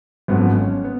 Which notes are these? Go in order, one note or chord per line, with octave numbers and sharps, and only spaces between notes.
G#1 F#2 F3 A3 B3
C#4
B3